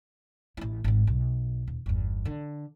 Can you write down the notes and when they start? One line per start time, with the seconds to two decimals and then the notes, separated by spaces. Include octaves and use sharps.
0.57 A1 E4
0.84 G#1 G#2
1.07 B1
1.68 D#1
1.86 G1 E2
2.25 D3